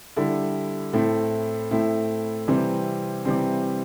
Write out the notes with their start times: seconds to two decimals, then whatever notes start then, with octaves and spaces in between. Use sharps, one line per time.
0.17 D3 G3 E4
0.93 A2 A3 C4 E4
1.71 A2 A3 C4 E4
2.48 C3 E3 G3 C4
3.25 C3 E3 G3 C4